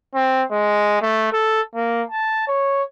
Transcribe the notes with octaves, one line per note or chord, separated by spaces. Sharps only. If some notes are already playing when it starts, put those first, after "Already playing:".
C4
G#3
A3
A4
A#3
A5
C#5